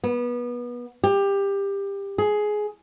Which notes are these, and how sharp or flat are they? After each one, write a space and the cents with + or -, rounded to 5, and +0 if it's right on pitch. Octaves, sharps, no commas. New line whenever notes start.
B3 -25
G4 +20
G#4 +15